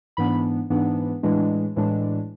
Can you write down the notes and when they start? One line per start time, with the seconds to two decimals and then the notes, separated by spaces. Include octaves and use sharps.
0.17 G#2 E3 B3 D4 B5
0.70 G#2 E3 B3 D4
1.23 A2 E3 G#3 D4
1.76 A2 E3 G#3 D4